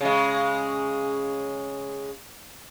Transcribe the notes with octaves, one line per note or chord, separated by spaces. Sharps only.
C#3 G#3